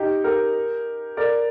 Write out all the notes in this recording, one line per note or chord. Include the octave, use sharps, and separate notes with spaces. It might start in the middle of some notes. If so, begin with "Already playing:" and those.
Already playing: D#4 G4
G4 A#4
A#4 D5